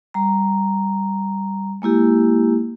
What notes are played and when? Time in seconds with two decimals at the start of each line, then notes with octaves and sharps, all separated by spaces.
0.14 G3 A#5
1.82 G#3 A#3 E4 G4